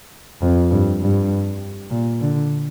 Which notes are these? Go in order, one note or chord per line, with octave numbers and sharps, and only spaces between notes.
F2
G2
G2
A#2
D3